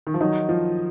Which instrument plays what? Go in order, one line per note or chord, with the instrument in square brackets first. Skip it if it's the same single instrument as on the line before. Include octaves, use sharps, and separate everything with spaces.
[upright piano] D#3
F3
[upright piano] D#3 F#3 [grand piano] D#4
[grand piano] F3